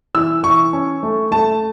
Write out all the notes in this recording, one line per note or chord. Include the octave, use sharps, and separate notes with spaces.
E3 E6
E3 C#6
C#4
A3
A3 A5